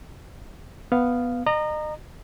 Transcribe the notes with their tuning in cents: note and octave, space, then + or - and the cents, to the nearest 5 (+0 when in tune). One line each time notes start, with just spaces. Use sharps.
B3 +0 F5 +0
D#5 -35 A#5 -10